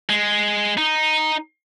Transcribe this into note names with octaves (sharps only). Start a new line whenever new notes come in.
G#3
D#4